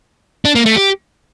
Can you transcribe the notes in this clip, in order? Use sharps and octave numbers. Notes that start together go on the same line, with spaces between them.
D4
A#3
A3
G4